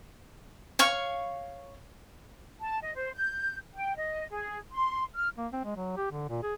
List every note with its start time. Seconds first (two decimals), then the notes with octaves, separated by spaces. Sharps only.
0.79 C#5 F5 C#6
2.61 A5
2.81 D#5
2.95 C5
3.16 G6
3.74 G5
3.96 D#5
4.31 G#4
4.72 C6
5.15 F6
5.37 A#3
5.52 C4
5.64 G#3
5.76 F#3
5.97 G4
6.11 D3
6.29 A#2
6.43 G#4